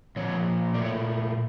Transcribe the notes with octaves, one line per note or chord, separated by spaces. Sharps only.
A#2 F3 A#3 C#5
A#2 A3 D5
C#5